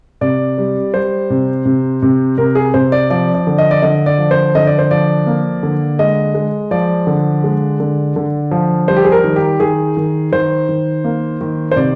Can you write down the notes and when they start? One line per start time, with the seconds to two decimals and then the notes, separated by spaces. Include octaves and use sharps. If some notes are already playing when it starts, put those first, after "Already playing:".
0.21 C3 D5
0.58 G3
0.94 G3 C5
1.30 C3
1.66 C3
2.02 C3
2.38 C3 A#4
2.55 G#4
2.74 C3 C5
2.92 D5
3.10 F3 D5
3.35 D5
3.47 D3
3.58 D#5
3.71 D5
3.82 D3 D#5
4.06 D5
4.18 F3
4.31 C5
4.55 D3 D#5
4.67 D5
4.79 C5
4.91 F3 D5
5.27 A#3
5.63 D3
5.99 G#3 D#5
6.34 G#3
6.71 F3 D5
7.07 D3
7.44 G#3
7.80 D3
8.16 D3
8.51 F3
8.88 G3 C5
8.97 G4
9.04 G#4
9.12 A#4
9.24 D#3
9.36 G4
9.60 D#3 G#4
9.97 D#3
10.32 D#3 C5
10.69 D#3
11.04 A#3
11.41 D#3
11.72 C5
11.76 C3 D5